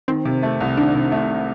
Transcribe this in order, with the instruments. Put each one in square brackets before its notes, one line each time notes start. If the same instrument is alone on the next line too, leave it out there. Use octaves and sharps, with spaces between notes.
[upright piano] D#3 [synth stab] C4
[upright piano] C3
A3
C2
[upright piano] D#3 [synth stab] D4
[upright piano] C3
A3